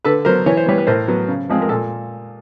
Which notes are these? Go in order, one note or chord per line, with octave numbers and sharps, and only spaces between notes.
D3 A4 B4
F#3 B3 A#4 C5
E3 C#5
C5
G3 B3 B4 C#5
B4
A2 A#4 C5
F#3 B3
C#3
F3 G#3 C4
A#4
A#2 A4